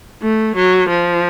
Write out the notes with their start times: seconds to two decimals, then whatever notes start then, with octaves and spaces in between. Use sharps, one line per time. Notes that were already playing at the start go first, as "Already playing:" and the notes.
0.23 A3
0.56 F#3
0.89 F3